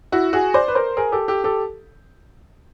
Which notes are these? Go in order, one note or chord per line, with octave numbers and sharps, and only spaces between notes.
E4 F#4
F#4 G#4
C5 D5
B4
A#4 C5
G#4 A#4
G4 A4
G4 A4
G4 A4